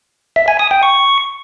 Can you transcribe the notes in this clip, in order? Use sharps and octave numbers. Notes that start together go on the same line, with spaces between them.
E5
G#5
D#6
G5
C#6